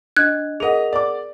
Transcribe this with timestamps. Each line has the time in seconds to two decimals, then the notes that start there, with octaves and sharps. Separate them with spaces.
0.16 D4 D#5 F#6 G#6
0.60 G#4 A#4 D#5 F#5 F7
0.93 D5 D6